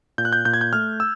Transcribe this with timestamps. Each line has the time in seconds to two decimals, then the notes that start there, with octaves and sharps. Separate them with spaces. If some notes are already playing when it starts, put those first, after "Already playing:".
0.18 A#2 G6
0.25 F#6
0.33 G6
0.45 A#2 G6
0.54 G#6
0.61 G6
0.73 A3 F6
1.00 E6